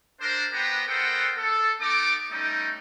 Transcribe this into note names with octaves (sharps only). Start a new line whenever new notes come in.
D4 A#4 C5
B3 G4 B4 C5 G5 A#5
B3 A4 A#4 C5 F#5 G5
A4
B3 D#4 A4 D6
G3 A3 C#4 D#4